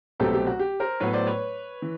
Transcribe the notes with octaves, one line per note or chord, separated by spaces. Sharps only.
C2 B2 F#3 A3 C4 G4 A4
G4
F#4
G4
A#4 C5
A2 F#3 B3 B4 C#5
C5 D5
B4 C#5
E3